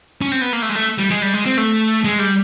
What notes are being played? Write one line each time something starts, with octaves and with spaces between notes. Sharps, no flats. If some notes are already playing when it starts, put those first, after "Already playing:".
C#4
C4
B3
A#3
A3
G#3
A3
G3
G#3
G3
G#3
C4
A3
G#3
G3